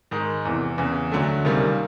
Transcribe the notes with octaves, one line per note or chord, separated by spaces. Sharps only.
G#2 D#3 G#3
E2 C3 E3
E2 C#3 E3
D2 D3 F#3 A3
C#2 C3 D#3 G3 A#3